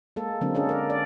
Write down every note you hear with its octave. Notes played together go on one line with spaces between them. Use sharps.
G#3 A#3 A4
D3 F#3 G#3 A#3 C4 D4
C#4 D4 G#4 A4
A#4 D5
D5